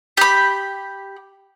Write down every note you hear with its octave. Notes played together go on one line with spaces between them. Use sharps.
G4 B5